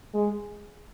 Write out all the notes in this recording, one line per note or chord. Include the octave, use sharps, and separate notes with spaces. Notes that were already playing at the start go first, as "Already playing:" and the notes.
G#3